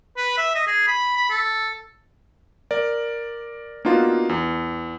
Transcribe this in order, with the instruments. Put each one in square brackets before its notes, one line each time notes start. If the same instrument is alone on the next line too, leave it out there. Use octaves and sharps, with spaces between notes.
[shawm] B4
E5
D#5
G#4
B5
B5
A4
[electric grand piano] A#4 D5
A#3 B3 D4 D#4 F4 F#4
E2